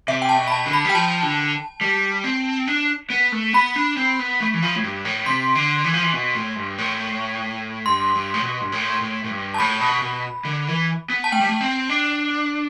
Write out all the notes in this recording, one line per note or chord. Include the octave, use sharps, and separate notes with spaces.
C3 E5
G5
A5
B2
B5
A5
D3
B5
G3
G5
F3 A5
D3
G3
C4
D4
B3
A3
B3 B5
D4
C4
B3
A3
E3
F3
A2
G2
A2
C3 C6
D3
E3
F3
E3
B2
A2
G2
A2
G2 C6
G2
A2
B2
G2
A2
A2
A2
G2
A5
A2 B5
B2
B2
D3
E3
B3
A5
A3 G5
G3
A3
C4
D4